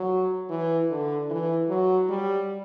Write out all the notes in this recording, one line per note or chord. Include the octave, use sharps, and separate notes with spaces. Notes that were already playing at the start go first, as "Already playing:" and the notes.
Already playing: F#3
E3
D3
E3
F#3
G3